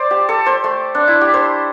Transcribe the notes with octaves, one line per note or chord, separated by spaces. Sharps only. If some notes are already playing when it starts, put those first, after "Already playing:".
Already playing: C5 D5
G4
A4
C5
A3
D4
E4
G4
C5